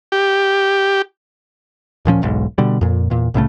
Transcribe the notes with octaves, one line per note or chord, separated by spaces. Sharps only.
G4
D1 A#2 F3 C#4
E1 B1 G#2
B2 D3 G3
F2 A#2
E2 A#2
C2 A2 C#3 A3